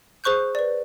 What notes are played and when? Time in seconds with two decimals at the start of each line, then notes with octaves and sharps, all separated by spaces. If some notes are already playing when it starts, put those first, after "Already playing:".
0.24 G#4 C5 C#6 F#6 G6
0.55 B4 D5